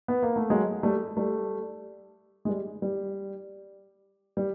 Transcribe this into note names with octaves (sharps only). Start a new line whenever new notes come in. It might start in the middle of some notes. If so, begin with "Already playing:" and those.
B3
A#3
A3
F#3 G#3
G3 A3
G3 A3
G#3
G3
G3
G3